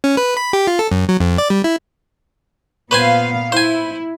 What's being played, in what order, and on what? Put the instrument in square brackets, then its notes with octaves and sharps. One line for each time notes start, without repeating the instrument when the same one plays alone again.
[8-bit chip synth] C#4
B4
B5
G4
F4
A4
F#2
F#3
F2
D5
G3
E4
[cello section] A#2 B3 F5 [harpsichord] B4 C5 G#5
[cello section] E4 [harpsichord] C5 G#5